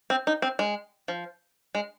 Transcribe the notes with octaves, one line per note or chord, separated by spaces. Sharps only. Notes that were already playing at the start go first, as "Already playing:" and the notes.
C4
D#4
C4
G#3
F3
G#3